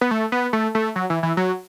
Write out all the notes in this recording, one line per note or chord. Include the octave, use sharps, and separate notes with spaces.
B3
A3
B3
A3
A3
F#3
E3
E3
F#3